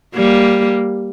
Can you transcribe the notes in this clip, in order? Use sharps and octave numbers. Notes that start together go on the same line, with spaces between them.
G3 A#3